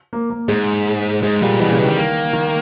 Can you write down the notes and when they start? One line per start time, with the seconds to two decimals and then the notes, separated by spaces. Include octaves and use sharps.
0.13 A#3
0.30 A#3
0.48 G#2 G#3
1.23 G#2 G#3
1.41 A#2 G3
1.59 B2 E3
1.69 A#2 C#3
1.78 B2
1.84 D#3 G3
1.97 A#3
2.33 D#3